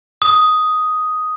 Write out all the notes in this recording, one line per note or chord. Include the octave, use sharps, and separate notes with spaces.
D#6